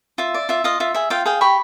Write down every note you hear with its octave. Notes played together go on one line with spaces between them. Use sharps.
F4 E5
D5
F4 E5
F4 D#5 F5
F4 E5
G#4 E5
F4 F5 G5
G#4 F5 G5
G4 B5 C#6